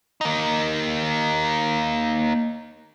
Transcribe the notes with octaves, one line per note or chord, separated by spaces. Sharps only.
A#3 D#4